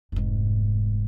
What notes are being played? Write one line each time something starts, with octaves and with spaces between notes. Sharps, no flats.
F1 G#2